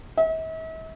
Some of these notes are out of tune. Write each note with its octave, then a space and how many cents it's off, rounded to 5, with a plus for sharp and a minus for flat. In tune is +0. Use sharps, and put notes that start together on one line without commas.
E5 -45